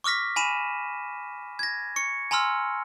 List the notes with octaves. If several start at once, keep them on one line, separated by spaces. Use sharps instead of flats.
C#6 D6 F6 A#6 B6
G#5 B5 D#7 E7
G#6 A#6
C#6 C#7
G#5 A#5 C6 E6 F6